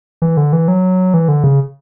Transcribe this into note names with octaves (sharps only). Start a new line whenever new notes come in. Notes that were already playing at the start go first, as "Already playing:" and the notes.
E3
D3
E3
F#3
E3
D3
C#3